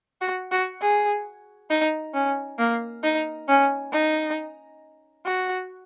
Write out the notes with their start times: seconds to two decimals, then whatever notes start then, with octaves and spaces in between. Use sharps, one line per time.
0.21 F#4
0.52 F#4
0.81 G#4
1.70 D#4
2.14 C#4
2.59 A#3
3.03 D#4
3.48 C#4
3.92 D#4
5.26 F#4